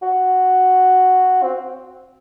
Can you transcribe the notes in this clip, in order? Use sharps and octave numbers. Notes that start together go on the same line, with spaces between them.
F#4
C4